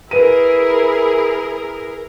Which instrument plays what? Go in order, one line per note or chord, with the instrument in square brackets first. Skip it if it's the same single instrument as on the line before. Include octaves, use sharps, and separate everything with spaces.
[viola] E4 G#4 [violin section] A#4 [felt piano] B4 D#7